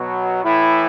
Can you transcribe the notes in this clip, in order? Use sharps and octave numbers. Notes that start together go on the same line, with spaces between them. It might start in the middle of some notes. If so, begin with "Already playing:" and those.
Already playing: B2 F#3
A2 E3 E4